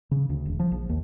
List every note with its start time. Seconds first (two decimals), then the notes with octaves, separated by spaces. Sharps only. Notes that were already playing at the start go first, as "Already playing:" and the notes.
0.11 C#3
0.29 D2
0.45 E1
0.59 F3
0.71 A#1
0.89 D#2